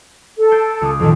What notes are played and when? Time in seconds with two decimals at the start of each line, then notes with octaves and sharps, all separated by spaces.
0.38 A4
0.52 G6 C7 D7
0.82 C#2 D6 D#6
1.00 F2 A#2 D#3 A4